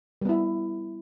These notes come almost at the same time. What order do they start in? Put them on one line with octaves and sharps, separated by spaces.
G3 B3 E4